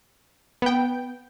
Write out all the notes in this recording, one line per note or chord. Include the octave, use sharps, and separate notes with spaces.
B3 G5